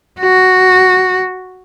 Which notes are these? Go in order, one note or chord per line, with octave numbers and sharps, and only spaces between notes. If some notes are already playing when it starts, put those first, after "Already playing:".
F#4